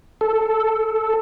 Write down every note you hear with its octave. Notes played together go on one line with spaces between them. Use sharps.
A4